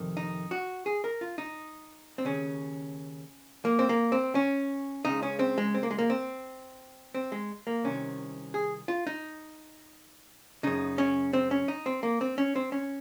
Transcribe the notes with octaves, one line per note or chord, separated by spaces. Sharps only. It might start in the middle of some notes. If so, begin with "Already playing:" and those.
Already playing: F2 C3 D#3
D#4
F#4
G#4
A#4
F4
D#4
C4
D#2 C#3 C#4
A#3
C4
A#3
C4
C#4
C#2 C#3 D#4
C#4
C4
G#3
C4
A#3
G#3
A#3
C4
C4
G#3
A#3
C2 C3 D#3 C#4
G#4
F4
D#4
F#2 C#3 D#4
C#4
C4
C#4
D#4
C4
A#3
C4
C#4
C4
C#4